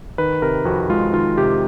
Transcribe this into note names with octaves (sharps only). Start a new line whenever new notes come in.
D#3 B4
C3 A#4
F2 F#4
G#3 F4
D#3 F4
C3 G4